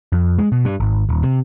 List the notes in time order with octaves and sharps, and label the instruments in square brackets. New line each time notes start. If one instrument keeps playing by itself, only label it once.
[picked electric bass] F2
G#3
B2
G2
G#1
D#1
C3